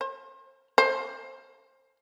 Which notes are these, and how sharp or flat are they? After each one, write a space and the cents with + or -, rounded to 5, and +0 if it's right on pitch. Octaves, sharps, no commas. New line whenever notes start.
C5 +35
C5 +25